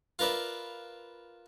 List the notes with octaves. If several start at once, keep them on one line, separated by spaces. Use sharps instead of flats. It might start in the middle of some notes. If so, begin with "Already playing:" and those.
F4 A#4 B4 D5 E5